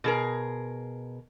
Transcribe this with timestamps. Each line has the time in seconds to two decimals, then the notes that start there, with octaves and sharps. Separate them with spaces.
0.04 B2 G#4 A#4